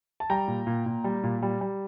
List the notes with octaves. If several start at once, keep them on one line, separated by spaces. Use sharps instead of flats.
A5
G3 G5 A#5
A#2
A#2
A#2
G3
A#2
G3
G3